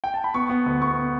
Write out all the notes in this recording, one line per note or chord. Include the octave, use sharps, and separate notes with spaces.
G5
A5
B5
B3 C#6
B3
D2
B3 C#6